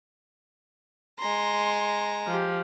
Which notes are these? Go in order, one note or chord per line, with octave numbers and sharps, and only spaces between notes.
G#3 A#5 C6
F3 G4